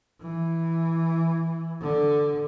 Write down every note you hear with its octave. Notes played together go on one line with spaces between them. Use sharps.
E3
D3